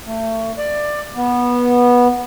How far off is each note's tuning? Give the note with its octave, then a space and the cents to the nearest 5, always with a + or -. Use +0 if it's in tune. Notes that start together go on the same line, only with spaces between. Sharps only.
A3 +30
D5 +15
B3 -15